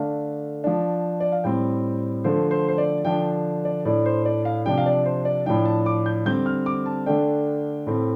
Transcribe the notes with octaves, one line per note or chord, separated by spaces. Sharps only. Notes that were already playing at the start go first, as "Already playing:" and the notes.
Already playing: D3 A3 D4 F5
F3 D4
D5
F5
A2 G3 C4 G5
D3 F3 A3 C5
C5
C5
D5
D3 F3 D4 G5
D5
A2 A3 D4 D5
C5
D5
F5
C3 F3 D4 G5
F5
D5
C5
D5
A2 F3 D4 G5
A5
D6
G6
D3 G3 C4 G6
F6
D6
A5
D3 A3 D4 G5
A2 A3 C4